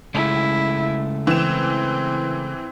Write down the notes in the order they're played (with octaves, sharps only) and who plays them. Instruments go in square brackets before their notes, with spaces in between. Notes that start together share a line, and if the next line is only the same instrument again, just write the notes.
[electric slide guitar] C#3 G#3 A3 [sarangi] E4
[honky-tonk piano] E3 E7 [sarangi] C4